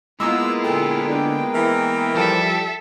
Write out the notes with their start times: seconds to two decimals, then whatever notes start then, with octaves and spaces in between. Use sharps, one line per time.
0.20 G#3 A#3 B3 E4 F4 E6
0.64 A#2 D3 A4 G5
1.07 D3
1.53 E3 A#4
2.15 F3 G3 A4 E5